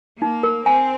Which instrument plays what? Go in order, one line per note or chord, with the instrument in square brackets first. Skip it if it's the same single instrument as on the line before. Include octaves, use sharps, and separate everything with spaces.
[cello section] A#3 [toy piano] D#4
[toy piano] A#4
[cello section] C4 [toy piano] G#5